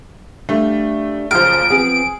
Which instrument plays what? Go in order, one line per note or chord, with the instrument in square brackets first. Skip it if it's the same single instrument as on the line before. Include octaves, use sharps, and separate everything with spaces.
[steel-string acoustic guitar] G3 D4 F5 [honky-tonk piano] A3
[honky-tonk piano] F#1 F3 C5 [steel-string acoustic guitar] C#3 A#3 [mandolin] F6 [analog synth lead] D7
[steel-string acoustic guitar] F3 B3 C4 [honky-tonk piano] G#4